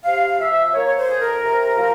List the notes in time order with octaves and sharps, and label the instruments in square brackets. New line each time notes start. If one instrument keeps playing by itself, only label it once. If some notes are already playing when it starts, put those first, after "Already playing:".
[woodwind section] C3 F5
F3 E5
A#3 C#5
C#5
C5
F2 G#4
A#4
C3
F3